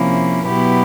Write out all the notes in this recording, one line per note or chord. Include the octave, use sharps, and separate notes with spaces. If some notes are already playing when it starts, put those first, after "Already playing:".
Already playing: C3 F3 A#3 C#4 E4
B2 F#3 B3 E4 G4